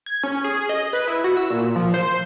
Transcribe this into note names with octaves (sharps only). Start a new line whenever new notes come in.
G#6
C#4
G#4
D#5
B4
E4
F#4
E6
A#2
F3
C5